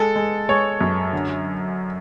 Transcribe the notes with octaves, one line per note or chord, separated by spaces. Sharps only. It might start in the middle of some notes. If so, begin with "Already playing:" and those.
Already playing: G#3 A4
G#3
G#3 C#5
F#2
D3